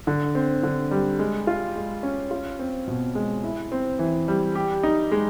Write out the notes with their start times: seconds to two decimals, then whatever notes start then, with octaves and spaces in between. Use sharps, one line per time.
0.07 D3
0.35 C4
0.63 D3
0.91 G3
1.19 G#3
1.47 F4
1.75 G#3
2.03 C#4
2.31 F4
2.59 C4
2.87 B2
3.15 G#3
3.44 E4
3.72 C4
3.99 E3
4.28 G3
4.55 G4
4.83 D#4
5.12 G#3